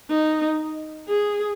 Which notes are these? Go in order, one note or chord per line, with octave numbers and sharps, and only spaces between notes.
D#4
G#4